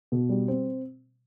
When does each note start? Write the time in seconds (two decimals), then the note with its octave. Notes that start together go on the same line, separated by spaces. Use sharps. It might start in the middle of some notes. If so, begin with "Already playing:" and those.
0.12 B2
0.29 G3
0.48 C4